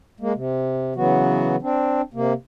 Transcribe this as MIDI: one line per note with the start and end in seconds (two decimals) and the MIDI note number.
0.20 0.33 56
0.20 0.33 58
0.35 0.94 48
0.96 1.56 49
0.96 1.56 52
0.96 1.56 54
0.96 1.56 59
0.96 1.56 66
1.62 2.01 60
1.62 2.01 62
2.14 2.33 48
2.14 2.33 58